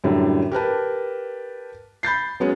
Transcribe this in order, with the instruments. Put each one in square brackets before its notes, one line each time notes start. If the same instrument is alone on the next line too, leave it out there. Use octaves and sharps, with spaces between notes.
[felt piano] F#2 A2 D3 G3
G4 A#4 B4 A5
B5 G6 A6 C7
F#3 G#3 B3 C#4